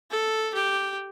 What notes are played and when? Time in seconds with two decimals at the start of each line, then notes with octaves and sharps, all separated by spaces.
0.11 A4
0.54 G4